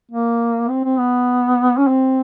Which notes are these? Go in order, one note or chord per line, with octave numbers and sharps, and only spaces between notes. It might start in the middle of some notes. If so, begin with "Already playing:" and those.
A#3
C4
C4
B3
C#4
C4